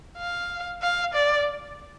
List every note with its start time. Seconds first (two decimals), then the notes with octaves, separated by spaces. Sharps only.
0.18 F5
0.82 F5
1.14 D5